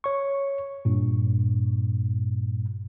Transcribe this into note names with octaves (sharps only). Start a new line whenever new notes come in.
C#5 C#6
G2 A#2